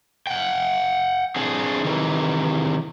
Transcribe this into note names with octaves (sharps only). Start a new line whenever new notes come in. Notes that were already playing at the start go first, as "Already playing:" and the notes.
F#5 G5
C4 D4 G#4
C3 D#3 E3